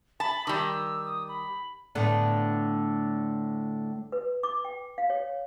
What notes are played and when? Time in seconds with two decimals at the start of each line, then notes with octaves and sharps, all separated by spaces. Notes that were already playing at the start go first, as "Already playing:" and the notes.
0.20 A5 B5
0.47 D#3 G3 E6
1.05 D#6
1.29 B5
1.95 A2 D3 B3
4.12 B4
4.43 D6
4.65 G5
4.98 F5
5.10 C#5